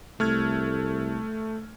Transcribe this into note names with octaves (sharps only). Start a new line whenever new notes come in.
C2 A3 F6 G#6